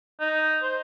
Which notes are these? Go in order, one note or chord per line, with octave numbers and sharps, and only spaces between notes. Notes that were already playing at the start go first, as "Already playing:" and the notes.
D#4
C5